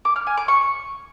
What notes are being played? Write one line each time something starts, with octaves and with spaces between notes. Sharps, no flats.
D6
F6
G#5
D6
C#6